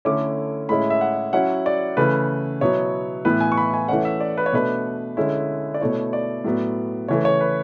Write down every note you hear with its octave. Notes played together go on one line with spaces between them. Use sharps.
D3 A3 C#4 E4 D6
A2 G#3 C#4 E4 B5
E5
F#5
F#3 C#4 E4 F#5
D5
C#3 E3 A3 E4 B4
B2 F#3 B3 E4 C#5
A2 E3 B3 E4 B4
G#5
C#6
B5
G#5
E3 A3 C#4 F#5
E5
D5
B4
C#5
B2 A3 D4 B4
D3 G#3 C#4 E4
D5
B2 A3 E4 C#5
D5
A2 F#3 B3
C#3 E3 A3 C#5
C#5
B4